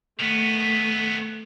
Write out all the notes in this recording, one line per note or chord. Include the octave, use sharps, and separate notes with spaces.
D#3 A3 B3